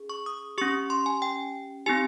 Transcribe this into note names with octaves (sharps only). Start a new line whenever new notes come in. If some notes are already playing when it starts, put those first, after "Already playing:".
Already playing: C#4 G#4
C#6
D#6
C#4 G4 C#6
C6
G#5
G5
C4 D#4 G4 G#5